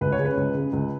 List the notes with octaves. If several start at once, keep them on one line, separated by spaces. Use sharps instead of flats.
C#2 B4
C#5
C#3 G#3
B4
C#2
C#3 G#3
C#2